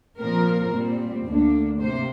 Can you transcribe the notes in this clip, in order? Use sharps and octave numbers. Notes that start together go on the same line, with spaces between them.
A#2 F3 C4 A#4
A#2 G3 C4
D2 D3 A#3 D4
C3 A#3 C5